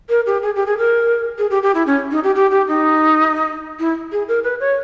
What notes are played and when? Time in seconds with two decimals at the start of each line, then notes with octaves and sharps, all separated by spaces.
0.09 A#4
0.26 G4
0.42 G#4
0.55 G4
0.66 G#4
0.78 A#4
1.38 G#4
1.50 G4
1.63 G4
1.74 E4
1.86 C#4
2.11 D#4
2.23 G4
2.35 G4
2.51 G4
2.67 D#4
3.79 E4
4.12 G#4
4.28 A#4
4.43 B4
4.60 C#5